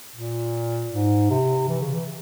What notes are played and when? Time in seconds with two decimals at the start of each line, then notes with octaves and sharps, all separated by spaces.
0.16 A#2
0.92 G#2
1.30 C3
1.69 E3
1.81 C#3
1.93 E3